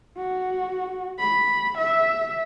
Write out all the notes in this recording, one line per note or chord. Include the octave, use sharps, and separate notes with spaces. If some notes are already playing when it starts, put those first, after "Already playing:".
F#4
B5
E5